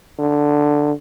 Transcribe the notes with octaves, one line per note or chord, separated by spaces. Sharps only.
D3